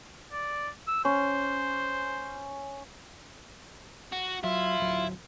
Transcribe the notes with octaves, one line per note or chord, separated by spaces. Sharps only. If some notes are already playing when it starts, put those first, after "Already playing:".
D5
E6
C#4 C5
F#4
F#3 E4 F4
D1 F#3